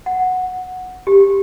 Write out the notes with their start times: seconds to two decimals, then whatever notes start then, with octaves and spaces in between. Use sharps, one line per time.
0.06 F#5
1.07 G4